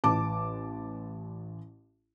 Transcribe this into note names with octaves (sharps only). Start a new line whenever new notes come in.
A1 A5 D6